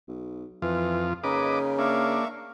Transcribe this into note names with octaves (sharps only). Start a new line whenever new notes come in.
B1
F2 E3 F4
C#3 A#3 D#4 B4 D#5 G#5 D6
A#3 D4 E5 F5 C#6